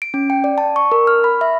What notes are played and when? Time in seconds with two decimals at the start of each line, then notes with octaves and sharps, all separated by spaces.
0.02 D7
0.14 C#4
0.30 G5
0.44 D5
0.58 A5
0.76 C#6
0.92 A#4
1.07 F6
1.24 B5
1.41 E5